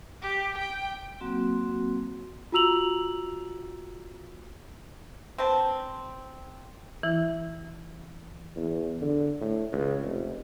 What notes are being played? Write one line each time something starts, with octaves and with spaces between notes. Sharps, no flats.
G4
G5
F#3 A#3 C4 F#4
F4 F#4 A#5 E6 F7 F#7
C4 D4 B4 A5
E3 E4
E2
D3
A2
C#2
F1